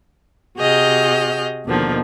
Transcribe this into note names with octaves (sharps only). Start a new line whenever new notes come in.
C3 F#4 G#4 D#5 F6 G6
D#2 B2 D3 D#3 F3